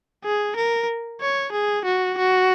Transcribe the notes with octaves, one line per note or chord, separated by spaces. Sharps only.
G#4
A#4
C#5
G#4
F#4
F#4